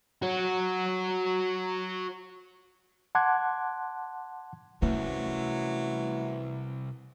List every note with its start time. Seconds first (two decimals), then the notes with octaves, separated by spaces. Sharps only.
0.22 F#4 C#5
3.15 F#5 A5 C6 D6 F#6 G#6
4.82 C2 E3 F#3 A3 C#4